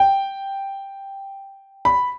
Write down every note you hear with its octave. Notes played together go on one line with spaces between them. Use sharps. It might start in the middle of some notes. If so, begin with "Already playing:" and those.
Already playing: G5
B5